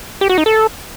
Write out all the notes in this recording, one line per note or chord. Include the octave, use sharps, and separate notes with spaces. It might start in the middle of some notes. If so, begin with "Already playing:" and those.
G4
F#4
D#4
A4